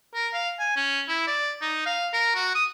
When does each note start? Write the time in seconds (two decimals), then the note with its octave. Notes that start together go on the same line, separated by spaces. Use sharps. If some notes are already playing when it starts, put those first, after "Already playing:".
0.14 A#4
0.33 F5
0.59 G#5
0.76 C#4
1.09 E4
1.27 D5
1.61 D#4
1.86 F5
2.13 A#4
2.35 F#4
2.55 D#6